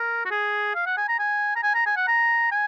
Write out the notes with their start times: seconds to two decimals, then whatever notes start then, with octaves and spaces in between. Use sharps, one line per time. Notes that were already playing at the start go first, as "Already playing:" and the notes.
Already playing: A#4
0.25 F#4
0.31 G#4
0.75 F5
0.86 F#5
0.97 G#5
1.08 A#5
1.19 G#5
1.56 A#5
1.63 G#5
1.75 A#5
1.86 G#5
1.96 F#5
2.08 A#5
2.52 G#5